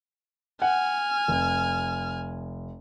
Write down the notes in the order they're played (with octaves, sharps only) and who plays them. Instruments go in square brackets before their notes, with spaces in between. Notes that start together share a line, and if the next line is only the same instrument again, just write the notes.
[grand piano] F#5 [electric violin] G#5 F6
[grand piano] F1